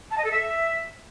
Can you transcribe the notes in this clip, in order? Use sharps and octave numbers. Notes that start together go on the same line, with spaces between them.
A5
D#5
A4
E5